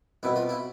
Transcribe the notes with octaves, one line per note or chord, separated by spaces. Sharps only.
C2 B2 E4
F4
E4